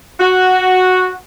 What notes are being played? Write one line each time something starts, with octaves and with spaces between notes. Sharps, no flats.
F#4